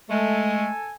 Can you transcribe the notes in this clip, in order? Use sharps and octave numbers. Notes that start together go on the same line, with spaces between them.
G#3 A3 A4 G#5